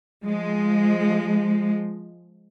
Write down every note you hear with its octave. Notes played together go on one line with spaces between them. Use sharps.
F3 G#3